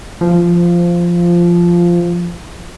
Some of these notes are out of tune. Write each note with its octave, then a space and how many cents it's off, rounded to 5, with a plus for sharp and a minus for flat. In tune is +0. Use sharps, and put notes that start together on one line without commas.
F3 -10